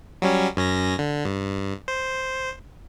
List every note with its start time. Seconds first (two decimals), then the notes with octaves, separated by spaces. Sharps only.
0.22 F#3 G3 C#4
0.57 F#2 C#4 A#6
0.99 D3
1.25 G2
1.88 C5